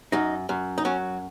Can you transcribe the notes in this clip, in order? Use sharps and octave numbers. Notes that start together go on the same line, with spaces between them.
F#2 D#4
F#2
D#4
F#3 C#4